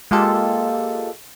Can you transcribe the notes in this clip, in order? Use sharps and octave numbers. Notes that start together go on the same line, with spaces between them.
G#3 A#3 F4 G4 A4